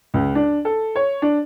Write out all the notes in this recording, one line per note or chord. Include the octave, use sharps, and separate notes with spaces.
C#2
D4
A4
C#5
D4